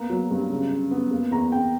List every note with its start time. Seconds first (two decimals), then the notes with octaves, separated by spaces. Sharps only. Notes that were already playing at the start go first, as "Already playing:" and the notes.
Already playing: A#3 B3 A#5
0.09 F#3
0.30 G2
0.50 C#3
0.71 C#3
0.91 B3
1.11 A#3
1.31 E2 A#5
1.52 E2 G5